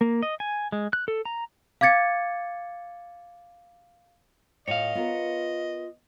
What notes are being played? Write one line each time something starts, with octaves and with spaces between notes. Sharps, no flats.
A#3
D#5
G#5
G#3
F#6
A4
A#5
F5 D6 G#6 A6 C#7
A2 F4 C#5 D#5 F5
B3 F4 A#4